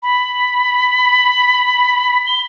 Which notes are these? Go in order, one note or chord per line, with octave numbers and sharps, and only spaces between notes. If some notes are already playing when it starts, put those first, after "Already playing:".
B5
G7